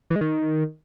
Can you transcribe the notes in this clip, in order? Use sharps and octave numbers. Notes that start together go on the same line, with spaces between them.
E3
G#3
D#3